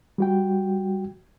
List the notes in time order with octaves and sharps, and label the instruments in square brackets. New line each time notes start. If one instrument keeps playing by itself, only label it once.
[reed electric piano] G3 F#4 G5